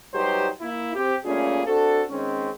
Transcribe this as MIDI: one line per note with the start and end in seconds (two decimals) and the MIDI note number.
0.15 0.49 54
0.15 0.49 55
0.15 0.49 63
0.15 0.49 67
0.15 0.49 71
0.15 0.49 72
0.62 0.95 58
0.62 0.95 64
0.96 1.15 60
0.96 1.15 67
1.25 1.63 55
1.25 1.63 57
1.25 1.63 58
1.25 1.63 61
1.25 1.63 65
1.25 1.63 68
1.67 2.03 60
1.67 2.03 62
1.67 2.03 66
1.67 2.03 69
2.10 2.50 51
2.10 2.50 56
2.10 2.50 60
2.10 2.50 61